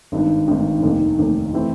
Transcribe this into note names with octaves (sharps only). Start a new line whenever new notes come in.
G#1 G2 D#3
G#1 G2 D#3
F1 D#2 D#3
F1 D#2 D#3
E3 A3 C4